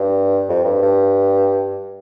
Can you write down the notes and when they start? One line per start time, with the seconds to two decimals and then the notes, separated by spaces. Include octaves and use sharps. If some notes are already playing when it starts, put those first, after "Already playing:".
Already playing: G2
0.49 F2
0.64 G2
0.82 G2